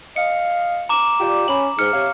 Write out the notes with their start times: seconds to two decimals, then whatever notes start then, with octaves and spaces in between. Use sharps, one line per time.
0.16 D#5 F5 C#7
0.89 A#5 D6 E7
1.20 F4 G4 D5
1.48 C#4 B5 F#7
1.79 G#2 F6 C#7
1.94 C3 C#5 F5